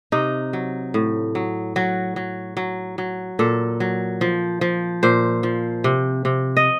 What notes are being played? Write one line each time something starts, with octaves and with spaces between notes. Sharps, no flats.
C3 D#4
F#3
A2
F#3
F#3 F#4
F#3
F#3
F#3
A#2 A4
F#3
F3
F3
A#2 C5
F3
C3
C3
D#5